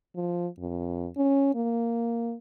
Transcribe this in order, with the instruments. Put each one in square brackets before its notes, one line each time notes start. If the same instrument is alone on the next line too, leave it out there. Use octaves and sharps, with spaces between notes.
[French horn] F3
F2
C#4
A#3